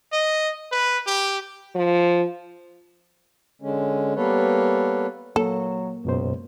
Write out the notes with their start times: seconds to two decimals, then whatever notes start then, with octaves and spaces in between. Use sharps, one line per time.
0.12 D#5
0.72 B4
1.07 G4
1.75 F3
3.62 D3 G#3 C#4
4.16 G3 A#3 B3 A4 B4 C#5
5.36 F#3 A#3 A4
6.05 C#2 F#2 B2 C5